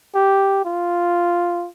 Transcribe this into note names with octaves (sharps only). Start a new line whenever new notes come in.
G4
F4